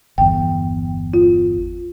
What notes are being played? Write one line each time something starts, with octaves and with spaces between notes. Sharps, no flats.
G1 E2 G5
F4